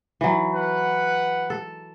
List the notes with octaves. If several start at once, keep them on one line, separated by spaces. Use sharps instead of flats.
E3 F#3
B4 F#5
A4